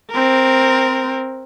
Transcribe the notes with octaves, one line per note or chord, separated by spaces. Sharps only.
C4 A#4